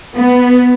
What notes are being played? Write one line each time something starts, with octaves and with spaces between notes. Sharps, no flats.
B3